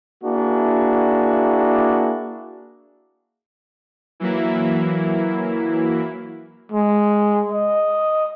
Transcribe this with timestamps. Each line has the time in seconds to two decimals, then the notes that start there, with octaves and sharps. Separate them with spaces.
0.23 A#3 D4 E4 F#4 G#4
4.20 E3 F#3 A#3 E4
6.72 G#3
7.52 D#5